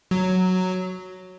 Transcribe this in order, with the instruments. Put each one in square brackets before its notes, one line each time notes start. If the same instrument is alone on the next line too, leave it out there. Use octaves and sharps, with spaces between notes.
[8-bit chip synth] F#3